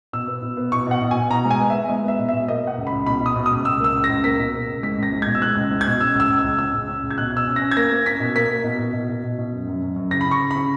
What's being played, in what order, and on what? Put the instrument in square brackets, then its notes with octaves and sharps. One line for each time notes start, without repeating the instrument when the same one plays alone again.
[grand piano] B2 E6
B3
B2
B3
B2 C#6
B2 F#5
B2
G#5
B2
B2 A#5
G#3
G#5
B3
E5
B3
G#3 D#5
B3 E5
B2
E5
B2
A#3 D#5
A#3
F#5
C#2
B5
C#2
B2 B5
B2 D#6
B2
D#6
C#2
C#2 E6
A#3 E6
C#2
A#6
C#2
A#3 B6
B2
A#3
C#2
G#3 B6
C#2 A#6
G#3
G#6
B2
E6
G#3 F#6
C#2
G#3
G#6
B2
C#4 E6
C#2 E6
C#2
E6
C#2
C#4 E6
C#2
C#4
C#2
G#6
B2 F#6
B2 E6
C#4
A#6
C#4
G#6
A#3 A#6
A#3
C#4 B6
B2
A#3 B6
A#3
B2
B2
B2
B2
B2
B2
F#2
F#2
F#2
F#2
C#3 A#6
B5
C#3
C#6
C#3
B5
C#3